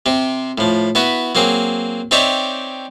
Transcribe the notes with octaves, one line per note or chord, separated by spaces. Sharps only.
C3 C4
A2 F3
B3 E4 F#4 B4
F#3 A#3 C4 G#4
C4 D#4 G4 C#5 D5 E5